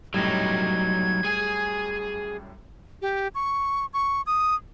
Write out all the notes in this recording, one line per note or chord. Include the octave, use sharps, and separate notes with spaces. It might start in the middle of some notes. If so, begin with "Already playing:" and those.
F#2 A2 F#3 G3 D#4 G#6
G#4 G#5
G4
C#6
C#6
D#6